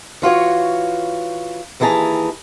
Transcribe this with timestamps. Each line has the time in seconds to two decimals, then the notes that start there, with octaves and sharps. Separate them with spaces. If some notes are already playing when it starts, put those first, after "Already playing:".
0.22 E3 F4 F#4 C#5
1.80 D#2 E3 E4 G#4 A5 A#5